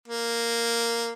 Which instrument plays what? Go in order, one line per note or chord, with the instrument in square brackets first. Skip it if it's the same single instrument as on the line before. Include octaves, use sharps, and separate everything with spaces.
[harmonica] A#3